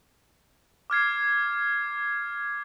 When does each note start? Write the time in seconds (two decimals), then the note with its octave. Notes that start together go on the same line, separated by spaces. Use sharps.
0.90 D6 F6 G#6 C7